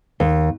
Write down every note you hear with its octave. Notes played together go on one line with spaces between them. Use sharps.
D#2